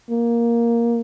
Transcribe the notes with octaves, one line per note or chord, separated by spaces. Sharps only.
A#3